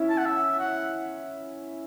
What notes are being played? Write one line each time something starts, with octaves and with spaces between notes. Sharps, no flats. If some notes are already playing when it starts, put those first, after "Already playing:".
Already playing: C#4 E4
A5
F#5
E5
F#5